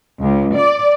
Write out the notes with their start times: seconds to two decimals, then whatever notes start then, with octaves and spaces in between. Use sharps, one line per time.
0.21 C#2
0.56 D5